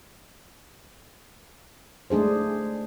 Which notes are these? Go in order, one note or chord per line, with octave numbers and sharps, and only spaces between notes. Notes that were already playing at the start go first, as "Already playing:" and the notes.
G#3 A3 D4 G#4 C5